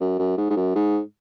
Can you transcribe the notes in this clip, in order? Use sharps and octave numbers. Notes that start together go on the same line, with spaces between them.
F#2
F#2
G#2
G#2
F#2
G#2